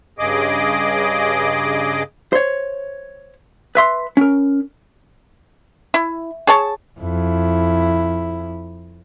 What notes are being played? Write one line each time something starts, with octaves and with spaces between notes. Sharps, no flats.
G2 C#3 G#4 D#5 D6
C5 C#5
B4 E5 C6
C#4 A#4
E4
G#4 C#5 A5
F2 E4